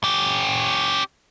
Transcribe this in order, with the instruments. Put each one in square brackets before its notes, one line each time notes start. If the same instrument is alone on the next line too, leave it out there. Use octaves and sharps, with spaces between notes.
[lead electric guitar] C#4 G4